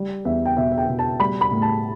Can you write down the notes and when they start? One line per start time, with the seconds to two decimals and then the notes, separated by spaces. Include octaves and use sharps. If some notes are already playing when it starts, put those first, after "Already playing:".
Already playing: G3
0.25 E2 E5
0.46 G5
0.57 B2 E5
0.72 E5
0.78 G5
0.88 B2
0.99 A5
1.20 G3 B5
1.41 B5
1.51 A2
1.62 A5